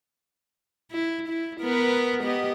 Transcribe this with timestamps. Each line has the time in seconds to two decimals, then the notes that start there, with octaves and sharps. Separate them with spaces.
0.91 E4
1.28 E4
1.61 B3 A#4 B4
2.23 B3 G4 D#5